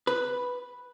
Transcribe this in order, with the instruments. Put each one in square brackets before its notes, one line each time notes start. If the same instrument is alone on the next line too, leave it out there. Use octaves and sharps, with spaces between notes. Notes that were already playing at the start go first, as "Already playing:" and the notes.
[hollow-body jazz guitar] B4